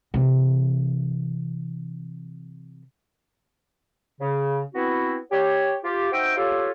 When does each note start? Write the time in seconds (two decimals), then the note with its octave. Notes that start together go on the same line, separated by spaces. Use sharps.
0.14 C3 E3
4.20 C#3
4.75 B3 C4 E4 F#4
5.31 G4 C#5
5.83 F4 G4
6.12 D#4 F#4 C5 D#5 E5 G5
6.36 F4 G4 A4 C#5